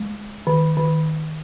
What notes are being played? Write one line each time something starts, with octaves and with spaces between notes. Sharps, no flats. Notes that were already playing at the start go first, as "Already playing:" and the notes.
Already playing: G#3
D#3
D#3